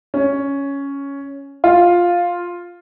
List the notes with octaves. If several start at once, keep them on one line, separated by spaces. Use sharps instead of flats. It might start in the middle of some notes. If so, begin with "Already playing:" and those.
C#4
F4